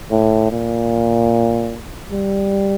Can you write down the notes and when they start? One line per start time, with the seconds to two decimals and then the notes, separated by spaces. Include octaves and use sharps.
0.11 A2
0.51 A#2
2.12 G3